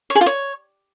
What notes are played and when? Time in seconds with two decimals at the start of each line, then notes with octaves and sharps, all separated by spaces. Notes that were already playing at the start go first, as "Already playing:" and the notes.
0.10 C#5
0.15 G#4
0.21 F4
0.26 C#5